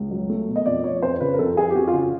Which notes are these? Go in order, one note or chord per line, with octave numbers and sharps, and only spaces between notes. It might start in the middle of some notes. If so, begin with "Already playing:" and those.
Already playing: C#2
F#3
A3
B2
D#5
F2 D5
F3 C#5
F2 C5
C#3 B4
A#4
F2 A4
F3 G#4
G4
F2 F#4
F4
C#3 F#4